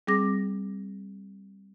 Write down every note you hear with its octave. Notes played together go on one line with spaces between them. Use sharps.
G3 C4 G#4 D6 A#6